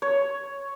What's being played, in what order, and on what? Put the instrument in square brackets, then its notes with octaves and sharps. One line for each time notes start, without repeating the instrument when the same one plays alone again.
[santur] C#5